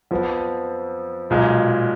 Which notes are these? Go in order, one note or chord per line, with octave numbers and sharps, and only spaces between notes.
F2 F3 B3
B1 A#2 G#3